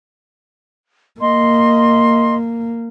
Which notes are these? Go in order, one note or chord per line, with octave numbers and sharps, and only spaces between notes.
A#3 D#5 C6